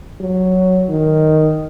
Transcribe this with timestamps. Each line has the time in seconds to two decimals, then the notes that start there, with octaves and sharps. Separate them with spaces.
0.20 F#3
0.89 D#3